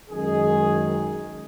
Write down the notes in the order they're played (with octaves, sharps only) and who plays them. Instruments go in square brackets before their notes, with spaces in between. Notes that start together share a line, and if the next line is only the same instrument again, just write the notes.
[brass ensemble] F#2 D#3 G#3 G#4